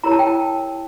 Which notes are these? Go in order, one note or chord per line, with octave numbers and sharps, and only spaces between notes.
E4 G4 A#4 C#5 A#5
A5
G5
A5